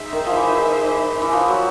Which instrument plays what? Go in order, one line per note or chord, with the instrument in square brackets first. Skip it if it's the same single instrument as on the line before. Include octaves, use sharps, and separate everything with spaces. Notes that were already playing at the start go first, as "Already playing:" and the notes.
Already playing: [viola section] D#4 G#4 C5 E5
[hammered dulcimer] D#3
F3
E3
E3
F3
F#3